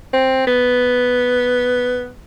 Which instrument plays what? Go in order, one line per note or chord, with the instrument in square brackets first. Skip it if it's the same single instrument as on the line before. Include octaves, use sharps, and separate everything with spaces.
[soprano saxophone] C4
B3